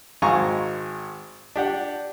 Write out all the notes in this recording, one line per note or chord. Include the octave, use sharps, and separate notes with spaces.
G#1 G#3 F5 G#5 A#5 C#6
D4 G4 F#5